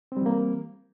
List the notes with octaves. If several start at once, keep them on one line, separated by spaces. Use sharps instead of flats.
E3 G3 A#3 C4